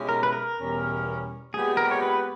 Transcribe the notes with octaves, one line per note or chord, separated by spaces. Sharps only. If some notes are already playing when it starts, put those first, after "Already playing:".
Already playing: B2 G#3 C#4 E4 G4
A#4
B4
A#4
E2 B2 G3 C#4
A#2 G#3 B3 G4 G#4
A#4
C#5
B4